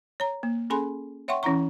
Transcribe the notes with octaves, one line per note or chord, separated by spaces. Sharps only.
C#5 A#5
A#3
C#4 G#4 A4 G#5 B5 C6
C#5 E5 F#5 G5 C6 C#6
E3 C#4 E4 F#5 A#5 C#6